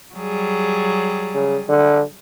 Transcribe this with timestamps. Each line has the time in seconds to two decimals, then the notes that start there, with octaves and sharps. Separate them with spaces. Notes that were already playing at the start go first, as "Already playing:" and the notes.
0.15 F#3 G3 G#4
1.35 C#3
1.69 D3